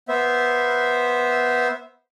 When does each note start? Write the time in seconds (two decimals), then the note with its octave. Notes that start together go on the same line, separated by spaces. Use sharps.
0.08 B3 C5 E5